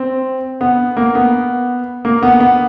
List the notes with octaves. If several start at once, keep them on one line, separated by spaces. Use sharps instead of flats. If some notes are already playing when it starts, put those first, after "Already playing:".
Already playing: C4
B3
A#3
B3
A#3
B3
B3